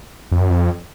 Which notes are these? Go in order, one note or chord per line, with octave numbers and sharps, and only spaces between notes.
F2
F#2
F2